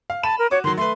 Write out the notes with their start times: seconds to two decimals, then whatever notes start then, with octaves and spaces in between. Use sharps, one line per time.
0.10 F5
0.23 A5 B5 D#7 E7
0.39 A#4
0.51 F#4 C#5 D6
0.64 D#3 F#3 C6
0.77 A3 B4 C6